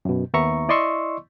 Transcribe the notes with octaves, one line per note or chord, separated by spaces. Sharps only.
F#2 B2
D#2 B3 E5 A#5 C#6
E4 D5 D#5 C6 C#6 E6